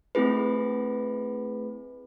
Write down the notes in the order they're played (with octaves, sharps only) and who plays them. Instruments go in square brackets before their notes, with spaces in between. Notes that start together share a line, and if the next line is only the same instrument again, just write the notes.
[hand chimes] A3 C4 E4 G#4 B4